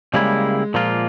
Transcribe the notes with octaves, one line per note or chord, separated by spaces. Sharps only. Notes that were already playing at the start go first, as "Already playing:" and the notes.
C#3 G3 G#3 A#3 E4
A#2 F3 A#3 F4